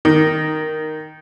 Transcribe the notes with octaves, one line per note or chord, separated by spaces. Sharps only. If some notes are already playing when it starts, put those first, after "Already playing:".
D#3